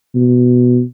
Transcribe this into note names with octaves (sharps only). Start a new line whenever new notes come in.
B2